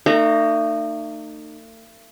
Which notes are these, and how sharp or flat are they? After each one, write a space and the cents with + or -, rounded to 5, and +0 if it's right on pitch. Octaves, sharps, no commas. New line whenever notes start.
A3 +45 D#4 -30 A#5 +0